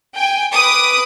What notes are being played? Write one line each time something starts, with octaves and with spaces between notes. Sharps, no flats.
G5 G#5
B4 D6 D#6